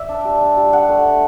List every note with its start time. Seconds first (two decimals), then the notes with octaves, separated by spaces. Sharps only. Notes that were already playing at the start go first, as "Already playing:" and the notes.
Already playing: D5 E5
0.09 D4
0.25 G3
0.41 D4
0.57 G3
0.73 D4 F#5
0.89 A3
1.05 D4